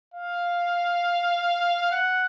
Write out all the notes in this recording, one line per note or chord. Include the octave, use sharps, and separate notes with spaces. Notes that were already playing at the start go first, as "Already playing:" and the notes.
F5
F#5